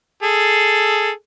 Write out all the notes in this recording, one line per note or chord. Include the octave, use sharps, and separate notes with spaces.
G#4 A4